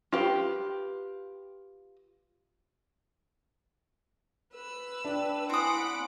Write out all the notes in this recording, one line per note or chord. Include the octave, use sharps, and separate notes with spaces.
F4 G4 B4
B4 E6
D4 D5 G5
C4 E4 F#5 G#5 B5 D6 D#6